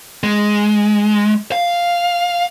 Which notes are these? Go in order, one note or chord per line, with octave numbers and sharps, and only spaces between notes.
G#3
F5